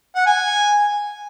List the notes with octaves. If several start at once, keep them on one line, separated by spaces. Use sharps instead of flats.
F#5
G#5